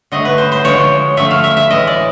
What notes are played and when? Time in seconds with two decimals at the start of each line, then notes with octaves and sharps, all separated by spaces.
0.12 D3 F#3 A3 D#5
0.25 B4
0.38 C5
0.52 C5
0.64 D3 F3 G#3 C#5
1.17 D3 F3 A3 E5
1.31 F5
1.44 E5
1.57 E5
1.69 A2 E3 G#3 D#5
1.87 D5